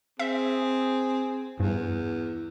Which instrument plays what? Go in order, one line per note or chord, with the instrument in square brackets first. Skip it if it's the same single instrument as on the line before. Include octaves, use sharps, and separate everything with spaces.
[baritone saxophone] C4 [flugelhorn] G#4 [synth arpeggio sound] E5
[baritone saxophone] E2 [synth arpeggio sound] G2